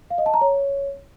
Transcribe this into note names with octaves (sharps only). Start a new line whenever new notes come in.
F5
D#5
A5
A#5
C#5